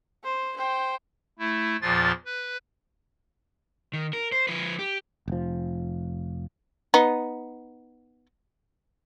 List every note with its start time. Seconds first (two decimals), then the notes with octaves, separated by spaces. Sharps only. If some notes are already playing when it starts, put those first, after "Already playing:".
0.24 C5
0.56 C5 G5
1.39 A3 E4
1.82 E2 A#2 F3 F4 A6
2.25 B4
3.93 D#3
4.13 A#4
4.32 C5
4.48 F3 B4
4.79 G4
5.28 F1 F3
6.94 B3 D#4